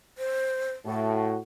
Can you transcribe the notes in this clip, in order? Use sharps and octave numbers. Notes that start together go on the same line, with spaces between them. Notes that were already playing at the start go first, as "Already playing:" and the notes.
C5
A2 F#4 A5